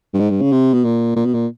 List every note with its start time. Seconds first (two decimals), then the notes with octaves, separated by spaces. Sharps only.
0.13 G2
0.19 G#2
0.30 G2
0.41 C#3
0.52 C3
0.74 B2
0.84 A#2
1.16 A#2
1.25 B2
1.34 A#2